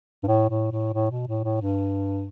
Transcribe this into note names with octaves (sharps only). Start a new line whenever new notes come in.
G2
A2
A2
A2
A2
B2
A2
A2
G2